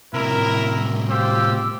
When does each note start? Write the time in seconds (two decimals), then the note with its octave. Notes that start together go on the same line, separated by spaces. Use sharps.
0.14 A2 C3 E4 A#4
1.10 F4 G4 C5 E6